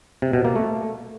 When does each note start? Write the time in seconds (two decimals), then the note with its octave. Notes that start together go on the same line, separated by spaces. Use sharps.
0.22 C3
0.33 B2
0.45 A#3
0.56 A3